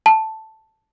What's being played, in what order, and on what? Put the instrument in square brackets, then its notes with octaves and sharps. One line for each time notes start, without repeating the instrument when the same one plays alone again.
[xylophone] A5